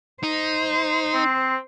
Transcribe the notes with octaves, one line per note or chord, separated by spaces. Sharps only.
D#4 C5
C4